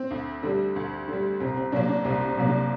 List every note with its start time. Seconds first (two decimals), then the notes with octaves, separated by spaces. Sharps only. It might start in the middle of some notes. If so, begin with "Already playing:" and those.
Already playing: C4
0.11 D2
0.43 D3 G3
0.76 D2
1.08 D3 G3
1.40 C2 C4
1.57 C4
1.72 C3 F#3 A#3 D4
1.89 D4
2.05 C2 C4
2.27 C4
2.37 C3 F#3 A#3
2.48 D4